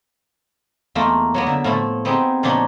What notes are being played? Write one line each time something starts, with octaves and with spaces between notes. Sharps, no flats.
E2 A3 A#3 D#4 F4
F#3 A#3 B3
D3 E5
A2 F3 A3 E4 A4
B3 C4 D#4 G4 G#4 G5
A#2 F3 D4 D#4 C#5 B5